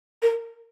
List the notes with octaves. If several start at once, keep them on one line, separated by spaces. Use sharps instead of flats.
A#4